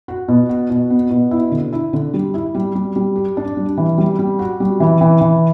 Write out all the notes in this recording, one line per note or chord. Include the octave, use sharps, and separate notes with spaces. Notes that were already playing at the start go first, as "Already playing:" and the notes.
F#4
B2
F#4
B2
B3
B2
E4
D3
E4
D3
G3
E4
G3
G3
G3
G4
D4
G3
E3
G3
G3
F#4
G3
E3
E3
E3